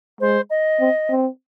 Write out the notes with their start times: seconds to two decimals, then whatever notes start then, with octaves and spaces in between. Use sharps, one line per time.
0.20 G#3 C5
0.50 D#5
0.80 C4
1.10 C4